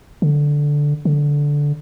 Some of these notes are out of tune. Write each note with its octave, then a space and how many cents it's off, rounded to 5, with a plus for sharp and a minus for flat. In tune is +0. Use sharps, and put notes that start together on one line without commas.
D3 -5
D3 -10